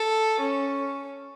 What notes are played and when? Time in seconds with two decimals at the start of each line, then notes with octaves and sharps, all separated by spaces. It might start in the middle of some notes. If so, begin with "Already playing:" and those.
Already playing: A4
0.41 C#4